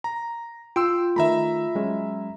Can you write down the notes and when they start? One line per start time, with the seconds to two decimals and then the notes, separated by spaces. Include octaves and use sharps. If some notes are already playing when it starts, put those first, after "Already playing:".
0.04 A#5
0.76 F4 G5 C6 E6
1.16 D#3 A3 E5 A#5 B5
1.75 F#3 G#3 C#4